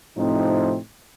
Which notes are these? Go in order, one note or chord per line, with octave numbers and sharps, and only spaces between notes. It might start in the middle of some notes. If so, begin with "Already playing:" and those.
A2 C3 F3 C4 D#4